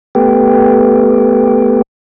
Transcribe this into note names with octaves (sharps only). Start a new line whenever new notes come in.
A3 B3 G4